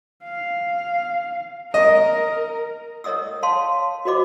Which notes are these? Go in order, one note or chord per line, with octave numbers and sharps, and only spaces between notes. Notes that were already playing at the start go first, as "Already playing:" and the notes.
F5
A#4 D#5
A#4 C#5 D#5 D#6 E6
C#5 F5 A5 C6
F#4 A#4 C5 D#5 D6